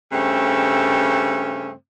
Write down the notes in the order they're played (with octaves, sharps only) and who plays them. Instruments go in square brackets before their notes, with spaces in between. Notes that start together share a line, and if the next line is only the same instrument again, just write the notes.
[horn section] G2 C#3 A3 C4